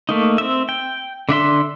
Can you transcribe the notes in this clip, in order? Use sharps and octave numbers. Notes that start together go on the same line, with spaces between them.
A3 A#3 D#4
C4 E5
G5
D3 D4 E5 C6